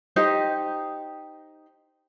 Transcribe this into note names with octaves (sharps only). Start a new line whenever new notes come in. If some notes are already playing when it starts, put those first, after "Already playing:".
D#4 G4 C5